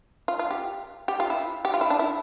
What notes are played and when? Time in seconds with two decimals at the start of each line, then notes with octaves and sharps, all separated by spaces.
0.28 F4
0.39 F4
0.51 G4
1.08 G4
1.20 F4
1.30 E4
1.65 G4
1.74 F4
1.81 E4
1.90 D4
1.99 E4